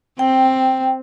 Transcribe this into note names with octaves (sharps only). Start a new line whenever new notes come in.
C4 G5